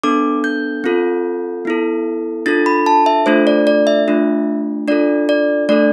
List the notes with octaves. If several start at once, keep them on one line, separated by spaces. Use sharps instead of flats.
B3 D4 A4 D6
G6
C4 F4 A4
B3 E4 A4
D4 F4 A4 A6
B5
A5
E5
A3 D4 F4 A4 C5
D5
D5
E5
A3 D4 F4
D4 F4 A4 D5
D5
A3 D4 A4 D5